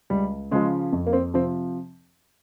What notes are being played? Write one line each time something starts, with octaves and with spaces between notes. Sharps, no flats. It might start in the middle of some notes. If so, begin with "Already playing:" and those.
C#2 G3
C#3 F3 G#3
F2
A#3
C4
C3 F3 C4